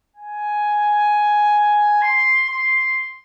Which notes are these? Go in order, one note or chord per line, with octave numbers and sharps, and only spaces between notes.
G#5
C6
C6